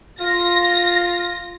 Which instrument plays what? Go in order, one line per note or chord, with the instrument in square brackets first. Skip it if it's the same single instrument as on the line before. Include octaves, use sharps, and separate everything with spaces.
[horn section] F4 [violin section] A#6